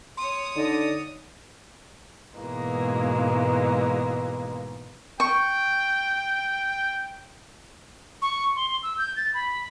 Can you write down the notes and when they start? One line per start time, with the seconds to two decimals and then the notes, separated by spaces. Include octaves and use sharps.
0.17 C#5 C6 D#6
0.56 D3 D#4 D5 D#5
2.38 G#2 B2 E3 G#3 A#3
5.20 G5 C#6
8.22 C#6
8.56 C6
8.83 E6
8.98 G6
9.16 A6
9.34 B5